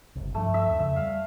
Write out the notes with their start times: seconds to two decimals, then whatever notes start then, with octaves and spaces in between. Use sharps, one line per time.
0.16 F#1 C2
0.35 G2 F3 A3 D4
0.54 E5 E6
0.67 D#2
0.79 F2 C#3 E5
0.96 G3 F5